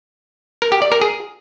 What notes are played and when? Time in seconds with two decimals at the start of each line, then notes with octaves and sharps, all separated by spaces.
0.62 A#4
0.72 G4
0.82 D5
0.92 A#4
1.02 G#4